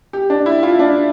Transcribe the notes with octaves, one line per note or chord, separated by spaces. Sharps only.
G4
D4
E4
F4
D4